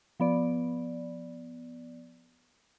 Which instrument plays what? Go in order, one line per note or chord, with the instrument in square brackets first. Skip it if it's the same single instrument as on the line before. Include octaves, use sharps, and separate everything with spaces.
[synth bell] F3 B3 D5